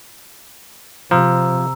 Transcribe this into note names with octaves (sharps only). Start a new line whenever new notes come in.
C3 F3 A#5 E6